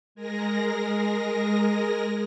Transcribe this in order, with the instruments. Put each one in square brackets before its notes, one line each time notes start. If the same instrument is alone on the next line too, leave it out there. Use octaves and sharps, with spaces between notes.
[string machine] G#3 G#4 A#4 A#6